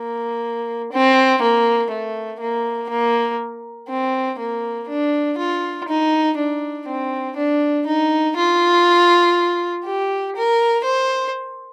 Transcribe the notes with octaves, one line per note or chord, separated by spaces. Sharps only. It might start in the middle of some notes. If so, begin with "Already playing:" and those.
Already playing: A#3
C4
A#3
A3
A#3
A#3
C4
A#3
D4
F4
D#4
D4
C4
D4
D#4
F4
G4
A#4
C5